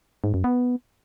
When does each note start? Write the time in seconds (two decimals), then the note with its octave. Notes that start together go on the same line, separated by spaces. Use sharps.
0.24 G#2
0.34 F#2
0.44 B3